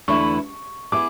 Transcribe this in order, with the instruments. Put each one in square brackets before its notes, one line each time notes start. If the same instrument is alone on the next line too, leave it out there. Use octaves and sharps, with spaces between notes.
[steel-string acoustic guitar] E2 D3 A3 E4 B4 [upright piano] C#6
[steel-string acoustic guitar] B3 E4 G#4 [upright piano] D6